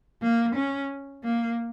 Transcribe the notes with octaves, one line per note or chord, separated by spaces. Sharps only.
A#3
C#4
A#3